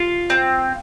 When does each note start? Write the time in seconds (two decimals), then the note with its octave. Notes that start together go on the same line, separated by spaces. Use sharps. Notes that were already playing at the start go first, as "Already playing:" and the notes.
Already playing: F4
0.30 C4